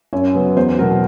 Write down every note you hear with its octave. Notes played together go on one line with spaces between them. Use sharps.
F#2 C#5
C#3 F#3 B3
E2 C5
B2 F#3 A#4